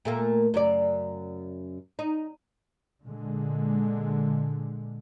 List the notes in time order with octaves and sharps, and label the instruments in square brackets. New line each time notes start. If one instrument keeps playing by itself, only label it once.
[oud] A#2 A3 A#3
F#2 C#3 D5
D#4
[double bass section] A#2 D3 G#3